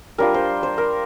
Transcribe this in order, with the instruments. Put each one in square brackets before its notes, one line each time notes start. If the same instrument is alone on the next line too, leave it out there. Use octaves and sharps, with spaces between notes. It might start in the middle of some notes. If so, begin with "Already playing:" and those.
[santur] G3 D4 F4 A#4
C5
C5
A#4